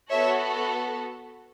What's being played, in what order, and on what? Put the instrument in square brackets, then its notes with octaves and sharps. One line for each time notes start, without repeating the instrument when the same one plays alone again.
[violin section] B3 F#4 A4 C#5 E5